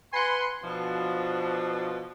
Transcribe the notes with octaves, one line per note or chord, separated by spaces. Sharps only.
B4 F#5 G#5 B5 C6
B2 F3 D4